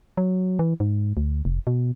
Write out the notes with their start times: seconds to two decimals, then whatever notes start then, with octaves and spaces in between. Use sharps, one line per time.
0.17 F#3
0.59 E3
0.80 G#2
1.17 D2
1.45 F1
1.67 B2